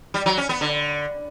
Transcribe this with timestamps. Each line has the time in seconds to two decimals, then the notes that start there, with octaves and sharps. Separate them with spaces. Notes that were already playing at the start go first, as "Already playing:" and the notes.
0.14 G3
0.26 F#3
0.38 C#4
0.49 B3
0.61 D3